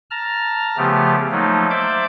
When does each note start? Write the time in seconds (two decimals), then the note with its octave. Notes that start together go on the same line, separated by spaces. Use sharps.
0.11 A5 A#5 F6
0.77 C#3 F3 A3 B3 G4
1.32 F3 F#3 A3 A#3 D#4
1.70 C5 D5 E5 D6 G6